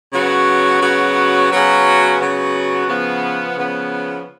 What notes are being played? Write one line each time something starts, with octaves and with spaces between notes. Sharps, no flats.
C#3 F#3 B3 F#4
C#3 F#3 B3 F#4
C#3 F#3 B3 F#4
C#3 F#3 B3 F#4
C#3 F3 B3
C#3 F3 B3